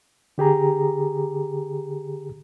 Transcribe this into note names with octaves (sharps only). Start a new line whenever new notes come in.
D3 G4 G#4 A#5